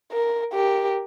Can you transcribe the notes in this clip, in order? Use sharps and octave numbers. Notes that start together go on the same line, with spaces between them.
A#4
G4 A#4